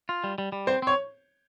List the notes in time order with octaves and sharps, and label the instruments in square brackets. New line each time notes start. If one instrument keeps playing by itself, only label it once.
[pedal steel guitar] F4
G3
G3
G3
[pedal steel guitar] C4 [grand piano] C5
[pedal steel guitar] C4 [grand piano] C#5